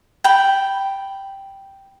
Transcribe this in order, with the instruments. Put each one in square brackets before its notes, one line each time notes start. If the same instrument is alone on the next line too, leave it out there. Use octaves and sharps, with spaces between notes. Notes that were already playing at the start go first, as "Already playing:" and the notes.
[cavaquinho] G5 B5